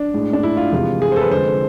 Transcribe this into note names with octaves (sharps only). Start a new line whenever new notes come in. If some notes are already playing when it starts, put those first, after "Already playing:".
Already playing: D4
A2 G#3
D4
E4
F4
F2 C3 E3 G#3
G#4
C5
A4
B4
F2 D3 G#3 C5